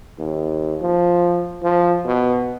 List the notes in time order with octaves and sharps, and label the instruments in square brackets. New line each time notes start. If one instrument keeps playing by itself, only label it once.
[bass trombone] D#2
F3
F3
B2